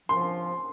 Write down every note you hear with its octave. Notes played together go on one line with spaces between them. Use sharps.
F3 C6